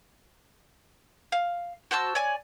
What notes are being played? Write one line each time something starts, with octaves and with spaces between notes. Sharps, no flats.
F5
F#4 C5 A5 E6
C#5 D5 G#5